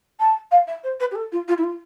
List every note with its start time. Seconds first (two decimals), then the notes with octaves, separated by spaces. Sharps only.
0.20 A5
0.51 F5
0.67 E5
0.83 C5
1.00 B4
1.11 G4
1.15 A4
1.32 F4
1.48 F4
1.58 E4
1.63 F4